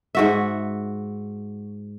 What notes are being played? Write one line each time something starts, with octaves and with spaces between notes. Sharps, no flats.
G#2 F#4 E5